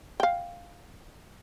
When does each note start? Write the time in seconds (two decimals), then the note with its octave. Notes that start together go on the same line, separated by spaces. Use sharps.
0.20 F5 G5